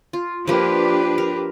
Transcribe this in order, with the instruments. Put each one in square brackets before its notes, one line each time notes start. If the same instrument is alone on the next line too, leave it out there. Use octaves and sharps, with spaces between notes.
[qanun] F4
[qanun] F3 A#3 [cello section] D4 G4 B4
[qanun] A#4